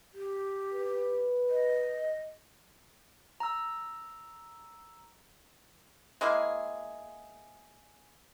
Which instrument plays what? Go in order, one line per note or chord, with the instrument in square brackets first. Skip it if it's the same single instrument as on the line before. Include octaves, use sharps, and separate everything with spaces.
[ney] G4
[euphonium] B4
[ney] D#5
[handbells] A#5 E6
[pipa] G#3 A#3 E4 G#4